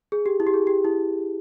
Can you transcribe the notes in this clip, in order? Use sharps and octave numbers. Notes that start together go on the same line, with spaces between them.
G#4
G4
E4
G4
G#4
G4
E4